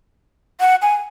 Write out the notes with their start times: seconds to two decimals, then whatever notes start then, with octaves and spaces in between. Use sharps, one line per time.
0.60 F#5
0.82 G#5